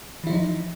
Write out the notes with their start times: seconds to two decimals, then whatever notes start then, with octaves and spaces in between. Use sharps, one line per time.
0.24 E3
0.27 E4
0.30 F3
0.33 D#4